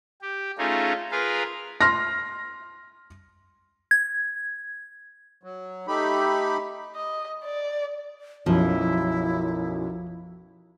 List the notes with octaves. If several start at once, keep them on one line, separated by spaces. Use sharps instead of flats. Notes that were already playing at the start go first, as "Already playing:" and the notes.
G4
A3 C#4 D#4 F4 G#4
F4 G#4 A#4 B4 F5
C6 F6 A#6
G#6
F#3
A3 D#4 G4 B5
D#5
D5
B1 F#2 F3 E4